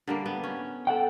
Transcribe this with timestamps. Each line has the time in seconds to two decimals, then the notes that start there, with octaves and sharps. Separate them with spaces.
0.07 D3 G3 A#3
0.26 B3
0.44 C#4
0.87 A4 F#5 G5